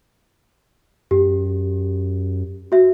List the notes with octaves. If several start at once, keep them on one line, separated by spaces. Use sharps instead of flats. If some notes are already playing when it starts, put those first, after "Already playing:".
F#2 G4
F#4 E5